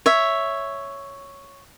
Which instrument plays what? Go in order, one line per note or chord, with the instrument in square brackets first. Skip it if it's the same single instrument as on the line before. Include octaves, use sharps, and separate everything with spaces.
[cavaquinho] C#5 E5